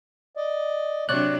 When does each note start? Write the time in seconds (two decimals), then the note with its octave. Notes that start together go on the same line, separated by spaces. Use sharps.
0.37 D5 D#5
1.09 C3 F#3 D4 C#5 D5 F#6